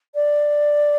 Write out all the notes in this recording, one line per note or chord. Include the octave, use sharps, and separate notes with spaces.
D5